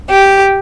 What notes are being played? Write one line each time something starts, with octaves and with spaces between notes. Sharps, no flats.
G4